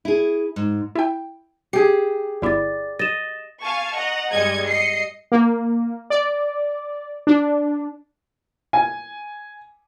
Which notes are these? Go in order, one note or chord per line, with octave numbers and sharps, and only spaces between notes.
E4 G#4
G#2
E4 G5
G4 G#4 C7
G1 E4 D5 D6 A6
D#5 A6 E7
F5 G#5 A5 C#6
D#5 F#5 A#5
G2 G3 G#3 D#5 G#6 C#7
D#5 C7 C#7
A#3
D5
D4
G#5